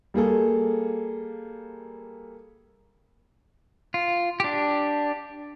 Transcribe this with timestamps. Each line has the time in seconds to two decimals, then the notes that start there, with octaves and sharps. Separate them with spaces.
0.14 G3 A#3 G#4 A4
3.94 F4
4.40 D4 G4